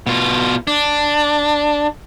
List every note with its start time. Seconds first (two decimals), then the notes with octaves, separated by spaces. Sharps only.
0.07 B2 F4
0.67 D4